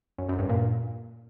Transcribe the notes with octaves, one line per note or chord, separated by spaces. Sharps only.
F#2
F#2
G2
A#2